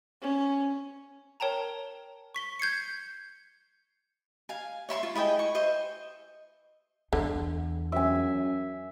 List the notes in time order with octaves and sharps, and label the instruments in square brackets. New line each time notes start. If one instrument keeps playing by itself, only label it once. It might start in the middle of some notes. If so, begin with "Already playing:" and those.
[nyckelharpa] C#4
[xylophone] A#4 C#5 G5 A5 A#5
C#6 B6 G7
G6 G#6 C7 C#7
[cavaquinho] F5 G#5
C#5 E5 C6 C#6
F4
E4 G#4 D#5 G5
C#6
C5 D#5 E5
[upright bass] E2 [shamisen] D3
[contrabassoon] F#2 [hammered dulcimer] E5 G#5